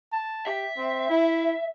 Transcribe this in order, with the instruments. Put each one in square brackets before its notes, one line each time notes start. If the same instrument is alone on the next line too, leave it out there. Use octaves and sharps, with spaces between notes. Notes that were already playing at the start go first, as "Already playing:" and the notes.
[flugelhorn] A5
[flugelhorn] G4 [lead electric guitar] E5
[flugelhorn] C4
E4